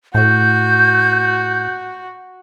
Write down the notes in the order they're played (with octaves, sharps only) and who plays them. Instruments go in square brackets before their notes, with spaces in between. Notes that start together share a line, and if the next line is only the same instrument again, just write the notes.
[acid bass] A2 [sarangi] F#4 [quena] G6